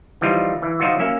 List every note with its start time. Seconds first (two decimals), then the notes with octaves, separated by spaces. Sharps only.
0.21 E3 F3 G3 D#4 F4
0.62 E3
0.80 F3 F#3 D#4 F4 F#4
0.99 A#3 C#4 E5